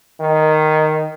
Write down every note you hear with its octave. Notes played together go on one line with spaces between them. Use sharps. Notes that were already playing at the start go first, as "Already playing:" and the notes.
D#3